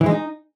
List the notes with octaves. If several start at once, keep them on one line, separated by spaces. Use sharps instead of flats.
E3
G#3
D#4